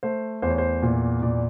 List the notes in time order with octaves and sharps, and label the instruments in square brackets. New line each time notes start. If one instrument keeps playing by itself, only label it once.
[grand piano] A3 C5
E2 C5
C#5
C5
A#2
A#2 D5